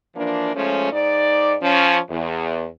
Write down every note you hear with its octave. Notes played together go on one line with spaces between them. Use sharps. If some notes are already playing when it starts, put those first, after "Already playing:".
E3 F3 A#3 D4
F3 G#3 A3 C#4
G#2 D#4 D5
F3 C#4
E2